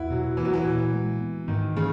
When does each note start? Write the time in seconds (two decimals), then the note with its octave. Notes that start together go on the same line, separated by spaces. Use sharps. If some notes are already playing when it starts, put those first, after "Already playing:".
Already playing: E2 B3 E4 F#4
0.10 B2 F#3
0.37 E3 A#3
0.45 F#3
0.54 E3
0.65 A#2
0.93 G#3
1.21 B3
1.48 G#2 D#3
1.76 C#3 E3